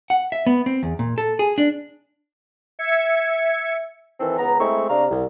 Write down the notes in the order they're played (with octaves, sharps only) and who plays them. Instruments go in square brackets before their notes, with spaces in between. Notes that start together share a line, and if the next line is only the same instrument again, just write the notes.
[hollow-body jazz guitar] F#5
E5
B3
C4
E2
A#2
A4
G#4
D4
[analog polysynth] E5 G#6 C#7
[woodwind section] D#3 E3 C4 A4
C#2 B3 A#5
G#3 A3 C4 E4 C#6
C3 D4 F5 A#5
C2